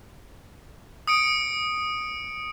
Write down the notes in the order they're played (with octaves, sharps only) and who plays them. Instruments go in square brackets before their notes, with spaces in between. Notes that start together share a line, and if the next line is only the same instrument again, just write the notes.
[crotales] D#6 C#7 D7